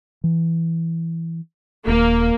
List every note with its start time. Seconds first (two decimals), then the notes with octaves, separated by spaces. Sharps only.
0.24 E3
1.87 D#1 A#3